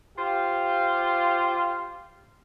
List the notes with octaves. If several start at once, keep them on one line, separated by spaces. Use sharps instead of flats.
F4 G4 C5 F5